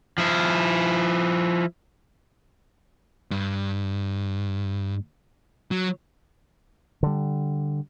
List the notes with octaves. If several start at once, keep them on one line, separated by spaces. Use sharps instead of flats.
F3 E4
G2
F#3
D3 G3